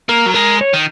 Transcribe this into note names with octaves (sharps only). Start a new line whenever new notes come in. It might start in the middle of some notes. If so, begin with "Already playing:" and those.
A#3 A#4
F#3
G#3 A#4
C#5
D#3